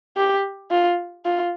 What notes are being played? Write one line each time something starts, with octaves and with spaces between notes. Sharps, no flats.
G4
F4
F4